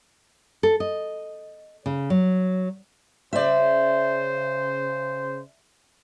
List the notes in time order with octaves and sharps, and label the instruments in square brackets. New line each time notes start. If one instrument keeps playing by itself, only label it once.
[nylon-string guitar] A4
D#5
C#3
F#3
[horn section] C#3 C5 [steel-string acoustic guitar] D5 E5